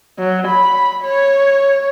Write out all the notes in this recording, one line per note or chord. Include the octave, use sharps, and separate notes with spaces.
F#3
B5
C#5